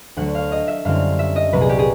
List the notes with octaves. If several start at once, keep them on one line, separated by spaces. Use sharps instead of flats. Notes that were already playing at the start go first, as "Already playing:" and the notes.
D2 D3 F#3 F#5
F5
D#5
E5
F#2 D3 G3 C4 E4 F5
E5
D#5
C2 A#2 F#3 B4
G#4
G4
G#4